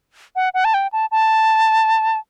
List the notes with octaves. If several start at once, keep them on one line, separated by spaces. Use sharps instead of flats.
F#5
F#5
A5
G5
A5
A5